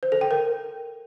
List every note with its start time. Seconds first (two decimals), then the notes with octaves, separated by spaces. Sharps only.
0.03 C5
0.12 A4
0.21 G5
0.31 A#4